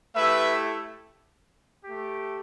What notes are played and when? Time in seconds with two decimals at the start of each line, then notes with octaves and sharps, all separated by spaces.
0.14 A3 E4 G4 B4 E5
1.85 A3 G4